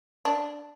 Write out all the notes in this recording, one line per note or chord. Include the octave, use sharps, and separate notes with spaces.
D4